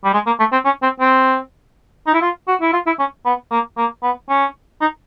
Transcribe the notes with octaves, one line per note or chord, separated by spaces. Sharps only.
G3
G#3
A#3
A3
C4
C#4
C4
C4
D#4
E4
F4
F#4
E4
F4
E4
C#4
B3
A#3
A#3
B3
C#4
D#4